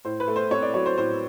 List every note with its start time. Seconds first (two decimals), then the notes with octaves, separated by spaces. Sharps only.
0.05 A2 C5
0.20 B4
0.28 A3
0.36 C5
0.51 C4 C#5
0.62 D5
0.74 F#3 C#5
0.86 C5
0.97 A2 C5